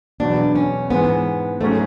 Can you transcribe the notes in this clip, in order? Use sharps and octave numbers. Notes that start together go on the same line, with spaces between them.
E2 B2 F#3 D4
C#4
G#2 E3 G#3 B3
G#2 F#3 A3 C#4 G#4